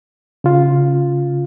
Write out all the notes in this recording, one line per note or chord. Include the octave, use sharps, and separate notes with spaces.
C#3 F4